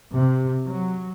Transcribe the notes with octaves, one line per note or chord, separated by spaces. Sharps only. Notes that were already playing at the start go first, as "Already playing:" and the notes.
C3
F#3